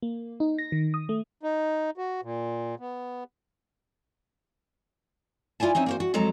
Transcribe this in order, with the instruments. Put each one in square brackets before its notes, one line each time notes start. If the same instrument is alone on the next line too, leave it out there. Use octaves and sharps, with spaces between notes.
[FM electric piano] A#3
D#4
A#6
D#3
D#6
A3
[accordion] D#4
F#4
A#2
B3
[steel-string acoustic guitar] E4 F4 D5 G#5 A5
C4 C#4 D#4 E5
A#3 F#4 C5
F#4
F2 F#3 G#3 A4 A#5